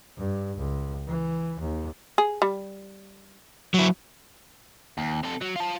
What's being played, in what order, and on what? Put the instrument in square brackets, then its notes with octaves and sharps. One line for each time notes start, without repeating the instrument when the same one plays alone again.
[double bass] G2
C#2
E3
D#2
[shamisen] G#4
G3
[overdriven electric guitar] F#3 E4
D#2
C3 A4
F#3
F4 A5